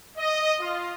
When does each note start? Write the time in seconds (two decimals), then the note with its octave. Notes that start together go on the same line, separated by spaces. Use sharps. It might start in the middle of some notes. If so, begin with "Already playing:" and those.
0.17 D#5
0.60 F4